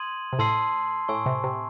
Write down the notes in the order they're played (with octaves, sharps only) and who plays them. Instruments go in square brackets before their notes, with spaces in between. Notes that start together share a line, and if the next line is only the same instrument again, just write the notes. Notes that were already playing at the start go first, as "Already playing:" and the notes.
Already playing: [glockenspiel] C6 D#6 G#6 D#7 F#7
[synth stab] C3
[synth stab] A2 [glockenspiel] A5 C6 E6 C7
[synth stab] A2 [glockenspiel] G#5 C#6 E6
[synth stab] C3
C3